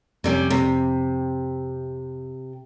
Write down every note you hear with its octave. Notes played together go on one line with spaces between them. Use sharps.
F2 C3 G3 C#4
C3